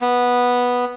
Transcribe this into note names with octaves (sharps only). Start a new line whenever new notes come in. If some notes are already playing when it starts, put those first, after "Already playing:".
B3